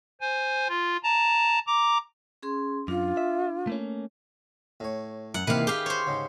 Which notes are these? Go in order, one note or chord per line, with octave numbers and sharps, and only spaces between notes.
C5 G#5
F4
A5 A#5
A#5 D6
C#4 G#4 C6
F#2 D4 F4
E5
A3 A#3 C#4
A2 C#5
F#2 F#5
C3 D#3 E3 A#3 B4 F5
G4 G#4 F5
C5 C#5
G#2 C#3